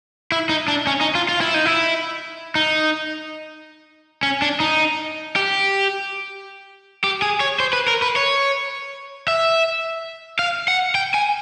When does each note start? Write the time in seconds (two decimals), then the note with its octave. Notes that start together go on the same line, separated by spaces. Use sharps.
0.32 E4
0.49 D#4
0.68 D4
0.87 C#4
1.01 D#4
1.15 F4
1.29 F4
1.41 E4
1.54 D#4
1.66 E4
2.55 D#4
4.23 C#4
4.42 D4
4.60 D#4
5.36 G4
7.04 G4
7.22 G#4
7.40 C#5
7.60 C5
7.73 B4
7.88 A#4
8.02 B4
8.16 C#5
9.28 E5
10.39 F5
10.68 F#5
10.95 G5
11.14 G#5